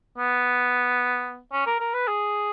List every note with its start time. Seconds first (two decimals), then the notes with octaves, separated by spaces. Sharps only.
0.18 B3
1.53 C#4
1.66 A#4
1.80 A#4
1.94 B4
2.08 G#4